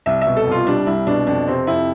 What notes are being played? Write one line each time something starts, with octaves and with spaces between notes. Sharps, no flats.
C2 E5
B2 E5
A4
C2 F4
G3 D4
C2 E4
B2 D4
F2 D4
C3 C4
F2 E4